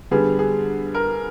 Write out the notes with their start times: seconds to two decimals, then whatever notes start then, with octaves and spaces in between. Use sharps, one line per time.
0.11 D3 G3 B3 G#4
0.39 G#4
0.94 A#4